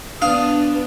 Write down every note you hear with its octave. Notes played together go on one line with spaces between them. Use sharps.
B3 D4 F5 D#6